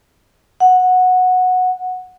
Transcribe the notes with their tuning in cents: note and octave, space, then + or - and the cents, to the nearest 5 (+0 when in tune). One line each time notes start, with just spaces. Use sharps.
F#5 -10